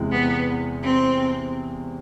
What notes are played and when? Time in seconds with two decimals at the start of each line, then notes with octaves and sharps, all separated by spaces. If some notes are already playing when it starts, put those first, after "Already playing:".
Already playing: E2 C3 E3 G#3
0.12 B3
0.83 C4